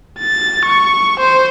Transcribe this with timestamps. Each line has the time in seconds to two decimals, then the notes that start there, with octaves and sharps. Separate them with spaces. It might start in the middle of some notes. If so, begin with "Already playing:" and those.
0.19 A6
0.65 C#6
1.20 C5